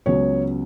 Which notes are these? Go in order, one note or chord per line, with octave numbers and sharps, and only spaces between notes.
C#2 C#3 F#3 B3 C#5